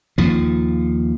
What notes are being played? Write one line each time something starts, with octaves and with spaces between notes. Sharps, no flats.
D#2 F3